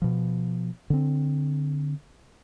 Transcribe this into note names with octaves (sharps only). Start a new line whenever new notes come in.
B2 F3
D3 C4